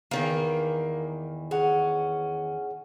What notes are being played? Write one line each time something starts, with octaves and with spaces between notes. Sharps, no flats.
E2 D#3 E3 A#3
C#4 G#4 F#5